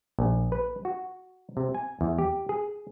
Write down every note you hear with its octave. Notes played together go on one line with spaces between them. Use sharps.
A#1
B4
F#4
C3
G#5
E2
G4
G#4